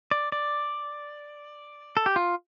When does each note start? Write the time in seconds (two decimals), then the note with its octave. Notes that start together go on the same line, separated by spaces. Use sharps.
0.11 D5
0.32 D5
1.97 A4
2.06 G4
2.16 F4